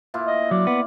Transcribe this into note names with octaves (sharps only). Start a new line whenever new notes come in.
A#2 E4 F4
D#5
F#3 D5
B3